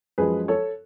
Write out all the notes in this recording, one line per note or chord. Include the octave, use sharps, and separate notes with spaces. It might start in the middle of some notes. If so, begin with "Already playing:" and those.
F#2 F3 G#3 G#4 B4
A4 C#5